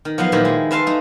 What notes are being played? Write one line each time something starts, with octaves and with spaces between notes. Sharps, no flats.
D#3
F3 F#3 B3 F5
A#2 D#3 E4 G4
G#3
B4 E5 F5 A5 C6
A3 D#4